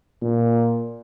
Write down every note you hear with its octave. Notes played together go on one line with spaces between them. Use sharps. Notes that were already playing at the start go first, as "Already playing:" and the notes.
A#2